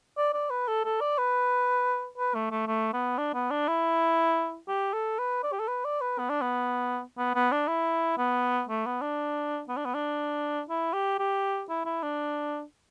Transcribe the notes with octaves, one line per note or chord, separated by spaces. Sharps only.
D5
D5
B4
A4
A4
D5
B4
B4
A3
A3
A3
B3
D4
B3
D4
E4
G4
A4
B4
D5
G4
A4
B4
D5
B4
B3
D4
B3
B3
B3
D4
E4
B3
A3
B3
D4
B3
D4
B3
D4
E4
G4
G4
E4
E4
D4